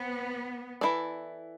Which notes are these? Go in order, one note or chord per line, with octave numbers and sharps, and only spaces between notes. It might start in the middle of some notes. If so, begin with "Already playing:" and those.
Already playing: B3 C4
E3 A3 E4 A4 D5